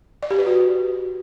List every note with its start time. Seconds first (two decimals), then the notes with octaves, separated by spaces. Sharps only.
0.23 D5
0.31 G4
0.39 B4
0.47 F#4